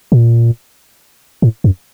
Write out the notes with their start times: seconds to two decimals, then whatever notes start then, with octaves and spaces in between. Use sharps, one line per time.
0.12 A#2
1.42 A2
1.64 F#2